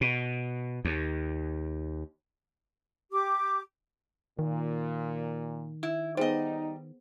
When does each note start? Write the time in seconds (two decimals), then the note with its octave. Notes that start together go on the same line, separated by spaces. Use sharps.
0.01 B2
0.85 D#2
3.11 G4 D6
4.39 A#2 D#3
5.83 E4
6.17 G3 B3 D#4 G#4 C5 D#5